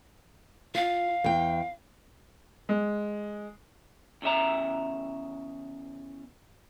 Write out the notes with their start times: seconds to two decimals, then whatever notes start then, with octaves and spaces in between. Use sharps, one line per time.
0.75 F4 F5
1.24 E2 G5
2.69 G#3
4.22 E2 C#3 E5 A#5